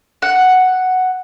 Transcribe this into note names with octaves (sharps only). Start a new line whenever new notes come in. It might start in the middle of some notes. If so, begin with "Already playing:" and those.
F#5